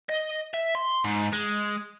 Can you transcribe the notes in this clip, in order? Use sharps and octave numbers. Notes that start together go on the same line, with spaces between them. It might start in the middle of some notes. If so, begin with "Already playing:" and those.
D#5
E5
C6
G#2
G#3